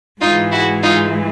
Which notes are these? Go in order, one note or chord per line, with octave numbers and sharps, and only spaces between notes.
G#2 E3 G#3 D#4 F4
E4 F#4
D#4 F4